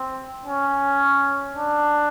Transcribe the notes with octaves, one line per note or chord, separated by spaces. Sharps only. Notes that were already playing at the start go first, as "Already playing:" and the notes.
Already playing: C4
C#4
D4